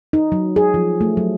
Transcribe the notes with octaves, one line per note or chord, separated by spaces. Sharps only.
D#4
F#3
G#4
F3
A3
F#3